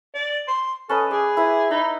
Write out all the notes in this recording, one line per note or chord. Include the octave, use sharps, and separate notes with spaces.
D5
C6
C#4 A4 B4 D#5
G#4 D6
E4 B4
D#4 B5